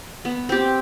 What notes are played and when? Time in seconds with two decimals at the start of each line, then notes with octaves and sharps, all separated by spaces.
0.25 B3
0.49 C4 G4